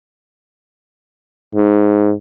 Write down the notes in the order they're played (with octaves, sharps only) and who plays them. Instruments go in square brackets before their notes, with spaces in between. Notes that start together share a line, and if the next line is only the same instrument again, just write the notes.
[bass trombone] G#2